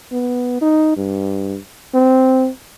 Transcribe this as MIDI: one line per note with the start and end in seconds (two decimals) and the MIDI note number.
0.12 0.61 59
0.61 0.96 63
0.97 1.58 43
1.94 2.49 60